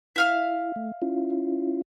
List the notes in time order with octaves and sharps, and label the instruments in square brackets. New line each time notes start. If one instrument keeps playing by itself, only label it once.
[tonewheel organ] E4 [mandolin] E5 F5 F6
[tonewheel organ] A3
C#4 E4 F4